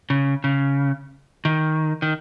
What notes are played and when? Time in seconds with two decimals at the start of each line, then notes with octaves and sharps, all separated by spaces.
0.10 C#3
0.44 C#3
1.45 D#3
2.02 D#3